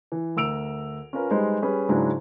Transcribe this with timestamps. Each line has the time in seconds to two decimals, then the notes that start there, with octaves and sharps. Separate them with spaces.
0.12 E3
0.36 D2 A#4 E6 D7 F7
1.13 C#4 F4 A#4 B4
1.31 G3 G#3 D#4 B4 C5
1.62 G3 C#4 G#4 B4
1.89 G#2 C#3 F#3 G#3 D4 E4